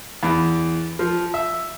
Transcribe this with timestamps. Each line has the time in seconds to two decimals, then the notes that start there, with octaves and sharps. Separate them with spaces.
0.23 E2
0.99 F3
1.34 E5